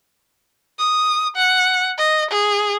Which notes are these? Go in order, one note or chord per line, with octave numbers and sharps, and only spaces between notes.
D#6
F#5
D#5
G#4